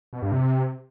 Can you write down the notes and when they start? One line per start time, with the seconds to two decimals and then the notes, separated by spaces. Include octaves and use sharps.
0.13 B2
0.22 G2
0.32 C3